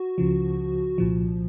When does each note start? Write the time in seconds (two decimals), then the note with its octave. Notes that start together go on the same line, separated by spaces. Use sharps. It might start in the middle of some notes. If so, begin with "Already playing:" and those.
Already playing: F#4
0.18 C#2 C#3 F3
0.98 C2 A#2 F3